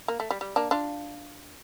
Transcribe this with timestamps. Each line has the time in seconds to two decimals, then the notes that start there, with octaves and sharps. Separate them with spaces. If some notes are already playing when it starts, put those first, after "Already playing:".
0.08 A#3
0.20 A3
0.30 G3
0.41 G3
0.56 A#3 D4
0.71 D4 F4